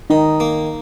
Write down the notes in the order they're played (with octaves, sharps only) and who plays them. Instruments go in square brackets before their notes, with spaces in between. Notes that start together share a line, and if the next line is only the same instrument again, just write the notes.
[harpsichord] D#3 [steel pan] D#4
[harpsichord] A#3